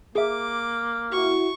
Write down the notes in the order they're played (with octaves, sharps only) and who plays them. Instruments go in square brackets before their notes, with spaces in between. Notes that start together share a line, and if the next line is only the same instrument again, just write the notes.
[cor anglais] A#3 [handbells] G#4 E5 [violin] D6
[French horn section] E4 F#4 [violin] C#6